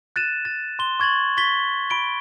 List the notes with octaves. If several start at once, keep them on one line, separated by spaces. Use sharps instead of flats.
F#6 A6 D#7 E7
A6
C6 G7
C#6 G#6 A6 F#7
C#6 A6 B6 G7
B5 D7 G7